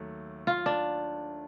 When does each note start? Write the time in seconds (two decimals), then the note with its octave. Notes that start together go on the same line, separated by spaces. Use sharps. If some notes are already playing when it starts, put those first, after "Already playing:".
Already playing: D#2 F#3 A3
0.47 F4
0.66 D4